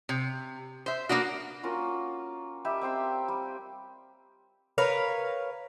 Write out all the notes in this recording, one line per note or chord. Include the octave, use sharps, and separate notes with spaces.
C3
C5 E5
A#3 B3 D4 F#4
A#3 C#4 F4 F#4
G3 G4 D#5 E5
C4 G5 C6 E6
G3
A#4 B4 C#5 F5